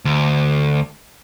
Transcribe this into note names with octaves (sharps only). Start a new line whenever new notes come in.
D2